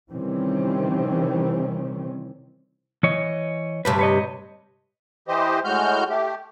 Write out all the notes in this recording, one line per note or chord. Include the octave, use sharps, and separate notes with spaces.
C3 D#3 E3 G3 C4 C#4
E3 C#5 D#5
D2 G2 C3 B4
B4 C#5 D#5
E3 G4 C5 D#5
A2 G#3 F#4 F6 G6
A3 G4